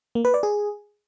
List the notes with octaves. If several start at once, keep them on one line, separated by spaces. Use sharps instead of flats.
A#3
B4
D5
G#4